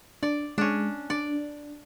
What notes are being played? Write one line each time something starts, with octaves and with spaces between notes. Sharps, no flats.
D4 D5
G#3 C#4 D4
D4 D5